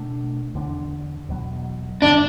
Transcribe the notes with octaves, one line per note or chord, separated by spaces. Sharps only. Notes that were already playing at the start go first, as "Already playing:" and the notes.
Already playing: B2 A3 D4
E2 D3 A3 D4
E2 B2 F#3
G2 D3 G3 C4 D4